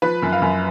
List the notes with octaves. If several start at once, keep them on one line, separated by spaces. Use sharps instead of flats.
F3 B4
F#2
F5
F#2